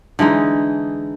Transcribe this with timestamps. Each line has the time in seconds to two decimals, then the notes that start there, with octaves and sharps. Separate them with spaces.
0.19 D3 E3 G#3 D#4